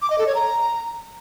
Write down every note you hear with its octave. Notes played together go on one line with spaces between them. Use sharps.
D6
D#5
A4
C#5
A#5